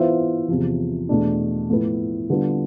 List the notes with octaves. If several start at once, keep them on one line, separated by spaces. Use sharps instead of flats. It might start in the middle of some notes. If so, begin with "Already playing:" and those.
Already playing: E3 B3 F4 C5 E5
E2 C3 F3
E2 B2 A3 D4
A2 F3 B3 E4
D3 G3 B3 F4